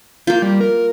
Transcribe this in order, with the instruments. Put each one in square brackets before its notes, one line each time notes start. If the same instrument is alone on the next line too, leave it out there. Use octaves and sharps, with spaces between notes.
[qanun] A#3 F4 [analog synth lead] G6
[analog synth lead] G3
A#4